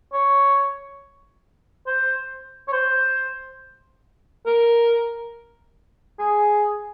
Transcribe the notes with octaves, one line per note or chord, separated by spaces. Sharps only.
C#5
C5
C#5
C5
A#4
G#4